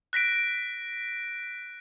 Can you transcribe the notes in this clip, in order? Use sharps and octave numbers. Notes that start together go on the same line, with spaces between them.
F#6 A#6 B6 D7